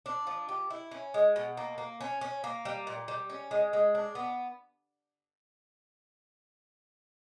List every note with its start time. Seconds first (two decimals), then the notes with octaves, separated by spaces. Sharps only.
0.06 D4
0.27 F3
0.49 G4
0.70 E4
0.91 C#4
1.14 G#3
1.36 B2
1.57 A#3
1.78 A#3
2.01 C#4
2.21 C#4
2.44 A#3
2.65 G3
2.87 A#2
3.08 G3
3.30 C#4
3.51 G#3
3.73 G#3
3.95 D4
4.15 B3